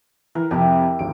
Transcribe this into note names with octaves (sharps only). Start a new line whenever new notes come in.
E3 A#4
F2 C3 E4 G4
G#1 D2 D7